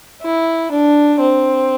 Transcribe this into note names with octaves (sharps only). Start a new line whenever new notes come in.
E4
D4
C4